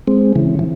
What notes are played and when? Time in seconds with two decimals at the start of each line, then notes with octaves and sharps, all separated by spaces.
0.07 G#3 C4
0.35 C#3 E3
0.59 E3